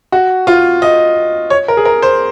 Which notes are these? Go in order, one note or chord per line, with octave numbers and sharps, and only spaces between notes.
F#4
F4
D#5
C#5
A#4
G#4
A#4
C5